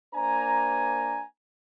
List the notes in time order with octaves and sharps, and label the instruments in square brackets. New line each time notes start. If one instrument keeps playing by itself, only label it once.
[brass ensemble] A#3 D4 C5 G#5 A#5